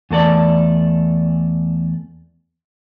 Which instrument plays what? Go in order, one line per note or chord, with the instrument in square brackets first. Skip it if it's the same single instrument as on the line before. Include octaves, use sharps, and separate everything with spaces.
[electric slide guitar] E2 A3 A4 D5